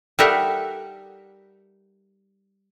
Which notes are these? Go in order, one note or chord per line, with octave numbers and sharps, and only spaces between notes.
G3 D#4 A4 A#4 E5 F#5